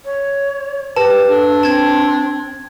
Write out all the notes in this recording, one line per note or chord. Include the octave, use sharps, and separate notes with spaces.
C#5
G4 B4 A5
D4 A4
C4 A5 G#6